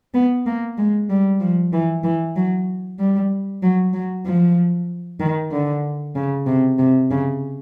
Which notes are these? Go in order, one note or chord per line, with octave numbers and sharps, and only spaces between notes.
B3
A#3
G#3
G3
F3
E3
E3
F#3
G3
F#3
F#3
F3
D#3
D3
C#3
C3
C3
C#3